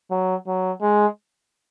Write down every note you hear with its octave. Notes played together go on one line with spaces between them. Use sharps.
F#3
F#3
G#3